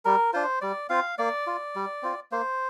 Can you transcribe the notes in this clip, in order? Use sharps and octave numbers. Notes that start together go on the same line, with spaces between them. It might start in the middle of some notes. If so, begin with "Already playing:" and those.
G3 A#4
D4 F4 C5
G3 D5
C4 F4 F5
A#3 D5
F4
G3
C4 F4
A#3 C5